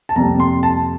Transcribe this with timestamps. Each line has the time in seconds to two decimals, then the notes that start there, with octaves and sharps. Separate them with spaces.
0.09 A5
0.16 F2 C3 G3 A#3 A#5
0.40 C6
0.63 A5